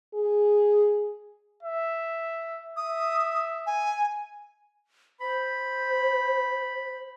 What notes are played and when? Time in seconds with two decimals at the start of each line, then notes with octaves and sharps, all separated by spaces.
0.14 G#4
1.63 E5
2.77 E5 D#6
3.66 G#5
5.21 C5 B5